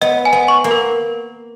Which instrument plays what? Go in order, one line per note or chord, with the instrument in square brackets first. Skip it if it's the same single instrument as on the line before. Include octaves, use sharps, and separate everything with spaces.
[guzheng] B3 [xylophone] D#5
[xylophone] G#5
[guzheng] B3
[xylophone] C#6
[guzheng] A#3
[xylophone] A#4